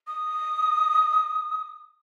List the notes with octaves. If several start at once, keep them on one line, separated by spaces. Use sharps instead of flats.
D#6